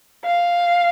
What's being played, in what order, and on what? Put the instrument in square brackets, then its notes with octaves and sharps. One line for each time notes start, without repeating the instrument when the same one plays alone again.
[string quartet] F5